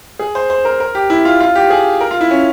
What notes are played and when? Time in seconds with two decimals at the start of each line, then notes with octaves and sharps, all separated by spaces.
0.19 G#4
0.35 C5
0.50 C5
0.65 A#4
0.80 A#4
0.95 G4
1.10 E4
1.25 F4
1.40 F4
1.55 G4
1.70 G#4
2.01 A#4
2.11 F4
2.21 E4
2.31 C#4